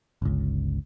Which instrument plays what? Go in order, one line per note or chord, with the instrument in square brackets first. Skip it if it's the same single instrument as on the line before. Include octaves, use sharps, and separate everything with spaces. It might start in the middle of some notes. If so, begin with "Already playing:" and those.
[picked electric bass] G1 C#2